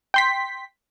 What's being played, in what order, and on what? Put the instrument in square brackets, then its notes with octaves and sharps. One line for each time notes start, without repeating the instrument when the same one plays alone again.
[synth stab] G5 C6 B6